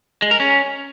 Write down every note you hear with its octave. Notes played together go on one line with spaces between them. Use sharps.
G#3
A#4
C#4